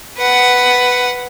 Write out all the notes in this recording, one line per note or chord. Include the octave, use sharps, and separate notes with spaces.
B4 F#5